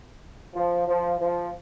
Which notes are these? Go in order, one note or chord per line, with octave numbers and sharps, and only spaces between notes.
F3
F3
F3